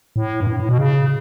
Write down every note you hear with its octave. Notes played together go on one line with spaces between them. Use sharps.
A2
G2
A2
A2
B2
C#3